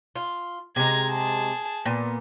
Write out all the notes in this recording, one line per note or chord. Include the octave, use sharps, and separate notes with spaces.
F4
C3 G#3 A#5 G#6
G#4 A5
A#2 B3